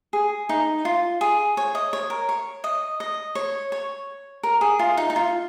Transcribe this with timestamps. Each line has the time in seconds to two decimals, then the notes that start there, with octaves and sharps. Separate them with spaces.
0.13 G#4
0.49 D#4
0.85 F4
1.21 G#4
1.57 C#5
1.75 D#5
1.93 C#5
2.10 A#4
2.29 C#5
2.64 D#5
3.00 D#5
3.35 C#5
3.72 C#5
4.43 A#4
4.61 G#4
4.79 F4
4.97 D#4
5.10 D#4
5.16 F4